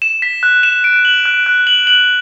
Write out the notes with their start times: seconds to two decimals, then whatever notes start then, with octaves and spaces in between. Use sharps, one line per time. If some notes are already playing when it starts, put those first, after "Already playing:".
0.02 E7
0.22 B6
0.43 F#6
0.63 E7
0.84 D7
1.05 F#7
1.25 F#6
1.46 F#6
1.67 F#7
1.87 F#7